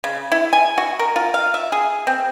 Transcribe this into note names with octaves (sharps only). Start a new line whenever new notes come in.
C#3
E4
G#5
F#4
A#4
F4
F5
E5
G#4
C4